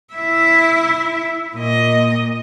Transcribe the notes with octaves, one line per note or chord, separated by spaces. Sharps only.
E4 E5
A#2 D#5